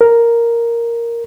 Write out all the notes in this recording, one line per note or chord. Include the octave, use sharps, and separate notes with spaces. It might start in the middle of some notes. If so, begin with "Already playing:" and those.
A#4